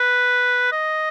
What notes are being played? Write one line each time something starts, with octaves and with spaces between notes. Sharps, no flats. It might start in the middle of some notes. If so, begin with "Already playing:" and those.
Already playing: B4
D#5